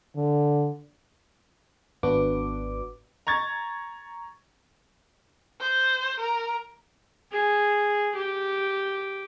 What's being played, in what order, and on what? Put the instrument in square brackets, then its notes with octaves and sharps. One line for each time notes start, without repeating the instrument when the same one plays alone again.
[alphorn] D3
[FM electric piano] G#1 B3 D4 F#4 B4 D6
[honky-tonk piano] A#5 C#6 G#6 A6
[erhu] C5
A#4
[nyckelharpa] G#4
G4